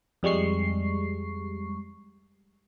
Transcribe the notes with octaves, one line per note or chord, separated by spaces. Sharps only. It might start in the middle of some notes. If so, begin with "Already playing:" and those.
F2 G3 G#3 C#6 C7